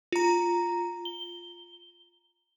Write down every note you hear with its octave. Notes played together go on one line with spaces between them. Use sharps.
F4 A#5
G7